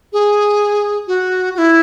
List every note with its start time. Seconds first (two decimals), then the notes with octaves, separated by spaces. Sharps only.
0.13 G#4
1.07 F#4
1.55 F#4
1.58 E4